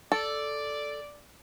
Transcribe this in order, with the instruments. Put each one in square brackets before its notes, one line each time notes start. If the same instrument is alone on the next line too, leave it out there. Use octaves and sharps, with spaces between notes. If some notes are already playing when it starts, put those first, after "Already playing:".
[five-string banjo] A4 [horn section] D5